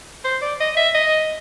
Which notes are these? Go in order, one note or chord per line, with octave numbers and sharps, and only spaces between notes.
C5
D5
D#5
E5
D#5